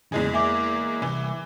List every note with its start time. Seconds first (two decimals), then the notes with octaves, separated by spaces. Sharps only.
0.12 E2 A#2 C#3 G#3 G#4
0.34 A#3 E5 G#5 D6
1.02 C2 E3